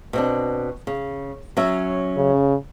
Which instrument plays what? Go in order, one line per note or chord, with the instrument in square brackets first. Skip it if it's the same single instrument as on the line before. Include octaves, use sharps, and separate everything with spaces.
[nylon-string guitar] B2 C4 D4
C#3
F#3 C#4 E5
[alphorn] C#3